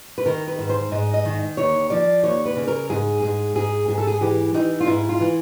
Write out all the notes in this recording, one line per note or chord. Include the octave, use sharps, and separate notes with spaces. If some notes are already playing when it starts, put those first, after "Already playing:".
B4
D#3 A#4
B4
G#2
C5
G#2 D#5
D#5
D#3
D#2 C#5
F3 D5
D#2 C#5
B4
C#3
A#4
G#2 G#4
G#2 G#4
G#2 G#4
G#2 G#4
A4
G#4
E3 G4
E3 D#4
F4
G#2 E4
F4
E3